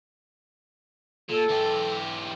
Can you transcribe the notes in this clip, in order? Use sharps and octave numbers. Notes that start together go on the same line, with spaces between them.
A#2 A4
E3 G4